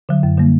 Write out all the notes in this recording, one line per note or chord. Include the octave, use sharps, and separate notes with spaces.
D3 F#3
F#2
D3 G3 A#3